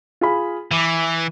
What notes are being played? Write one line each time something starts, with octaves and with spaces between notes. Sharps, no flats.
F4 G#4 B5
E3 D6 D#7